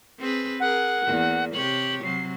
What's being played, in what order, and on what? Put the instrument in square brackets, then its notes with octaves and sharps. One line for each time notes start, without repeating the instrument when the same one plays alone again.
[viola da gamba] C4 G#4 B4
[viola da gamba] G#4 A#4 [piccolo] F#5
[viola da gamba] E2 A#3
[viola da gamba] C3 G4 C#5 [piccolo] F#7
[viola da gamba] C3 F#3 [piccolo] C7